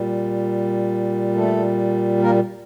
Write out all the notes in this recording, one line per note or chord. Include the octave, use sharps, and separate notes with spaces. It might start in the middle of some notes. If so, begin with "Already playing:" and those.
Already playing: A#2 G3
A3 A4
A#3 A#4